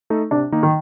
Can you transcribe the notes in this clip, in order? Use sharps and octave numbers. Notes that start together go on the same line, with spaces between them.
A3 D#4 A4
C3 D4
D#3 A#3 D#4
D#3